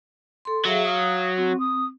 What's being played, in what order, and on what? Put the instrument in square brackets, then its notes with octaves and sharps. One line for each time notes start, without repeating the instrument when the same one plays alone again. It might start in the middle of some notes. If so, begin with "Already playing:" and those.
[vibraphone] A4 C6
[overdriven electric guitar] F#3 [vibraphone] G#4 E5 F5
[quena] F5 [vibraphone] D#6
[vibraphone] C4 [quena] F#4
[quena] D#6